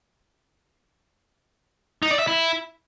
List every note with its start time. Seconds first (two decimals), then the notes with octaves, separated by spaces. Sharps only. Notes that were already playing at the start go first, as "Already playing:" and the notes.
2.02 D#4
2.11 D5
2.19 E5
2.27 E4